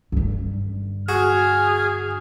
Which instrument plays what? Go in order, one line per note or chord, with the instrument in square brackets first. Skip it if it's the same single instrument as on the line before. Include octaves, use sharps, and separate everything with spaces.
[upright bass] G2 D3
[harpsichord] F#4 [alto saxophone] G#4 [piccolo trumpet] F6